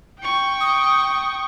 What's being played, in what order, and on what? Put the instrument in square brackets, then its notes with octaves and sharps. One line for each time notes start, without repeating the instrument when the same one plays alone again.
[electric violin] G5 C#6
[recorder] D#6